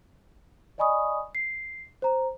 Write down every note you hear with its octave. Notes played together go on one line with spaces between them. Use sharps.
D5 D#5 G#5 B5 C#6 D#6
C7
C5 A#5